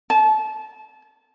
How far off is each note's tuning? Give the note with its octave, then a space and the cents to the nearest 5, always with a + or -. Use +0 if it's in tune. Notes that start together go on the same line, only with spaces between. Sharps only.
A5 -30